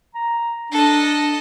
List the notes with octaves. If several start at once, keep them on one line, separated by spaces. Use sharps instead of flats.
A#5
D4 A4 D#5